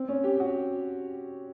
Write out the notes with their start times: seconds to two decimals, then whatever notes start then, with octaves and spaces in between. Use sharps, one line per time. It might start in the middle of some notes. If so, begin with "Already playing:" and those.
Already playing: C4
0.08 C#4
0.24 G4
0.40 F#4